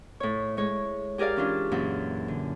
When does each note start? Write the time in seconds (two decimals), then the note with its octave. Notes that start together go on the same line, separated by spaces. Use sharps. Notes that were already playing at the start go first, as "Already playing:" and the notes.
0.20 A2 C#5
0.57 G#3 C#5
1.18 G4 G#4 A#4 D5 F5
1.36 E3 C#4 D4 F4
1.72 F#2 A#2 E3
2.28 D3